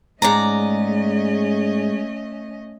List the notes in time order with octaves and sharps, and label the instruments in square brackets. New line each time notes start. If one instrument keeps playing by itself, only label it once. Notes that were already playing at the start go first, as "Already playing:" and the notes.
[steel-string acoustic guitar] G#2 D5 A#5 [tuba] G#3 [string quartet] A3 C#4 D#5